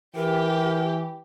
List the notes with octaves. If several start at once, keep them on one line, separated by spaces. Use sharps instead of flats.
E3 G4 A#4